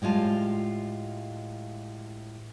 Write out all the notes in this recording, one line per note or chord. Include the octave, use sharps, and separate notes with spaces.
A2 G3 G#3 F4 A5